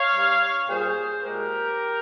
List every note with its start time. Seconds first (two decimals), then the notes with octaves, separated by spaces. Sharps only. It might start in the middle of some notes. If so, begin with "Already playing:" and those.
Already playing: C#5 F5
0.13 G2 G3
0.68 A#2 G3 G#4 C5
1.24 A#2 G#3 G4 A#4